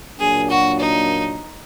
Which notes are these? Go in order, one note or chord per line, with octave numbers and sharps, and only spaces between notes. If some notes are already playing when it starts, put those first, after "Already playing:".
A#2 F#3 A#3 D4 G#4
F#4
D#4